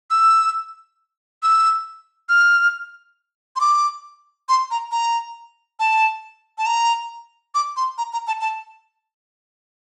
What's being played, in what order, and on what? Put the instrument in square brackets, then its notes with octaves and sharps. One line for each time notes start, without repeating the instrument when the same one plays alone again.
[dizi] E6
E6
F6
C6
D6
C6
A#5
A#5
A5
A5
A#5
D6
C6
A#5
A#5
A5
A5